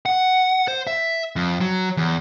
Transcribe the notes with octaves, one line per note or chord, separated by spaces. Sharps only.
F#5
C5
E5
F2
F#3
E2